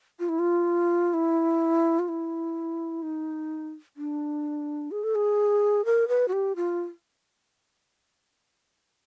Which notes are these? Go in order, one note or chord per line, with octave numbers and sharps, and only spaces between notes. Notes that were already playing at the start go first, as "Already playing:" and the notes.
F4
E4
F4
E4
F4
E4
D#4
D4
G#4
A4
G#4
A#4
B4
F#4
G4
F4